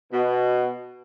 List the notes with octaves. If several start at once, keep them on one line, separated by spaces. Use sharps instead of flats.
B2